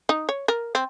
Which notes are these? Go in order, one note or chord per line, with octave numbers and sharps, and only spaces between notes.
D#4
C#5
A#4
C4